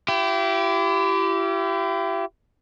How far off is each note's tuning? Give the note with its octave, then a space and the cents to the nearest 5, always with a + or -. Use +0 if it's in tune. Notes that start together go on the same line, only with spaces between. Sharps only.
E4 +40 G4 -20